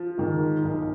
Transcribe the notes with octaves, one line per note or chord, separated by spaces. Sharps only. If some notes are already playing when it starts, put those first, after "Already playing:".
Already playing: F3
G#2 D#3
B1